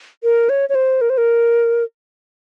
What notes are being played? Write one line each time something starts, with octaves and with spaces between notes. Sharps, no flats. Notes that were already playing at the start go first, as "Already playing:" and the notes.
A#4
C#5
C#5
C5
A#4
C5
A#4